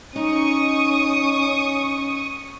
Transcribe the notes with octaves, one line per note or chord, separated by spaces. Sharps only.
C#4 D#4 C#6 D#6